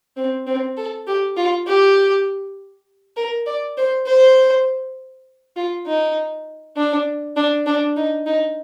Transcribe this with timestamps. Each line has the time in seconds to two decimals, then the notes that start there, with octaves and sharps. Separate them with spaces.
0.17 C4
0.47 C4
0.77 A4
1.07 G4
1.37 F4
1.67 G4
3.17 A#4
3.46 D5
3.77 C5
4.07 C5
5.56 F4
5.87 D#4
6.77 D4
7.36 D4
7.66 D4
7.97 D#4
8.26 D#4